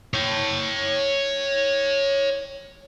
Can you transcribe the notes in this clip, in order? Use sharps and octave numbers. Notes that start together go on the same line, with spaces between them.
C#5 G5